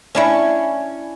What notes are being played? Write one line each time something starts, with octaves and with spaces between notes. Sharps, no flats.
C#4 D4 E4